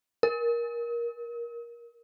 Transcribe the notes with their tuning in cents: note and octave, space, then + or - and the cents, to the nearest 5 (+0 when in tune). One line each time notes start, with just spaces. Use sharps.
A#4 +20